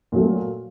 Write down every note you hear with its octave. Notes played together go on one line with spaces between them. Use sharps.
A#2 F#3 A3